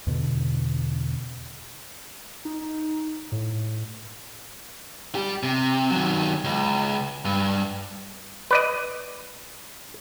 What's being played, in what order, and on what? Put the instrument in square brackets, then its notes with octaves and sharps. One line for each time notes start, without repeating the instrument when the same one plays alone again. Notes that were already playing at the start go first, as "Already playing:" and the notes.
[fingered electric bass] E2 B2 D3
[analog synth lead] D#4
A2
[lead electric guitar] G3 G4
C3
D#3 F#3
C#2
G2
[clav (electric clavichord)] B4 D5 D#5